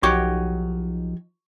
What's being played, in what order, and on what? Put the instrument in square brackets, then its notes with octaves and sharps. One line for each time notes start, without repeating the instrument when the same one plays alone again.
[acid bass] B1 [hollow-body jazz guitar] F3 D#4 [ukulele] F#4 G4 C#5 [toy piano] C#6